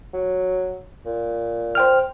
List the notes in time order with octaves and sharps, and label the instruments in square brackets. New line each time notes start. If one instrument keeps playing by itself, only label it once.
[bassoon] F#3
A#2
[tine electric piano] C5 G5 F6